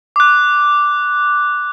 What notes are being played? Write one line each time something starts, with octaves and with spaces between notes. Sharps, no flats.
D6 F#6